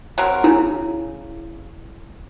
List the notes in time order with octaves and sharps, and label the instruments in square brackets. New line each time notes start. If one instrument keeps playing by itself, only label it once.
[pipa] F#3 C4 A#4
[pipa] C#3 [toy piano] E4